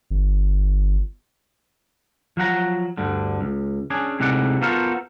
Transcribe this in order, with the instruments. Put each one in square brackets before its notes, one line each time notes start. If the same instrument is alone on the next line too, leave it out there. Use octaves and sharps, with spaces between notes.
[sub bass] G1
[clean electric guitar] F3 F#3 F#5 A#5
D2 G2 D3
C#2
C#4 D4 G#4
A2 C3 G#3 D#4 D5 F#5
B3 F4 F#4 A4 A#4 C5